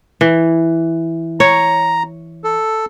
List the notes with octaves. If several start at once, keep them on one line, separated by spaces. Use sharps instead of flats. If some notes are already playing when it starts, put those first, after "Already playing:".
E3
C#5 A#5
A4